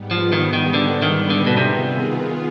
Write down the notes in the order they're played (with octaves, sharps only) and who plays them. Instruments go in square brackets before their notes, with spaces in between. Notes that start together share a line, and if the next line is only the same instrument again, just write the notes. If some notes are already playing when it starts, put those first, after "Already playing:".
Already playing: [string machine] G#2 G3 B3
[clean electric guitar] F3
D#3
D#3
D3
D#3
D3
B2
[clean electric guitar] C3 [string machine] D#3 B3 F4 G#4